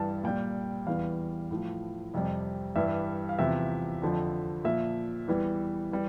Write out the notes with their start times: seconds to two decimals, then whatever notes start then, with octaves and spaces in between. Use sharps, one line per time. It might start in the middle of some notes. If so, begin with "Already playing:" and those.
Already playing: G2 E3 G3 A5
0.24 A#2 G3 G5
0.87 E2 E3 G3 F5
1.51 A2 F3
2.14 F2 C3 G3
2.76 G2 E3 G3 E5
3.29 F5
3.39 E2 C3 F3 E5
4.02 F2 D3 F3
4.64 A#2 F3 E5
5.28 E2 E3 G3
5.92 E3 G3